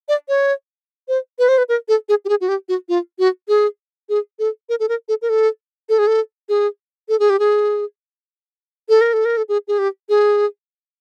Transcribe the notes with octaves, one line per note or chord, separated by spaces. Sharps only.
D5
C#5
C5
B4
C5
B4
A#4
A4
G#4
G4
G#4
F#4
G4
F#4
F4
F#4
G#4
G#4
A4
A#4
A4
A#4
A4
A#4
A4
A4
G#4
A4
G#4
A4
G#4
G4
G#4
A4
A#4
A4
A#4
A4
G#4
G#4
G4
G#4